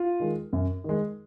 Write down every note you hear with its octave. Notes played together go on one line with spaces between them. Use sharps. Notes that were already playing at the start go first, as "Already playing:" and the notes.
Already playing: F4
D#3 G#3
F#2
D#3 G#3